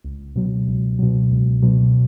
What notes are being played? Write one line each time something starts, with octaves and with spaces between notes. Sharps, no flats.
C#2
B2 F#3
C#2
B2 F#3
C#2
B2 F#3